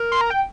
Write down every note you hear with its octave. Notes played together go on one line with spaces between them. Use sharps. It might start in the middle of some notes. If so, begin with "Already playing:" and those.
Already playing: A#4
C6
A#5
G5